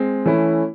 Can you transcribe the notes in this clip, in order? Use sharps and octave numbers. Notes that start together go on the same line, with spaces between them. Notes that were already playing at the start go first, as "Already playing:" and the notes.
Already playing: G#3 C4
E3 A3 C#4 E4